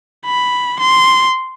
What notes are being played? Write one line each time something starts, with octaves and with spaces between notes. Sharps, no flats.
B5
C6